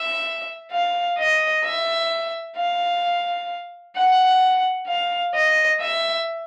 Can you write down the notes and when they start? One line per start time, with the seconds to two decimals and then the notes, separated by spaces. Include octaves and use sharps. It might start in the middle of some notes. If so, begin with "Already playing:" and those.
Already playing: E5
0.72 F5
1.18 D#5
1.64 E5
2.56 F5
3.96 F#5
4.87 F5
5.34 D#5
5.81 E5